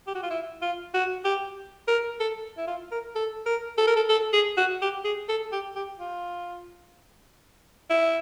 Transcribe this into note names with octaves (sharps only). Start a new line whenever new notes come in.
G4
F#4
F4
E4
F4
F#4
G4
A#4
A4
E4
F4
A#4
A4
A#4
A4
A#4
A4
A4
G#4
F#4
G4
G#4
A4
G4
G4
F4
E4